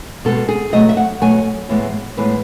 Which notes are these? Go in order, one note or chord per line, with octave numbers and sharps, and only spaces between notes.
B2 G#3 B3 A4
G#4
B2 F#3 A3 D#5
E5
F#5
B2 F#3 A3 G#5
A2 E3 G#3 B3
A2 E3 G#3 B3 B4